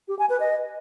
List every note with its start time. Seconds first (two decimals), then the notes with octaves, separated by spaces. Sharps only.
0.08 G4
0.19 G#5
0.29 B4
0.40 D#5